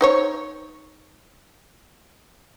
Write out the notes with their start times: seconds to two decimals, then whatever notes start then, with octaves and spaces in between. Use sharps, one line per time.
0.01 D#4 C5 C#5